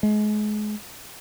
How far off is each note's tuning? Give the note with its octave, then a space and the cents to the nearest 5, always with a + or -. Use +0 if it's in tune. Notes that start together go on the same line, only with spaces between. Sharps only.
G#3 +30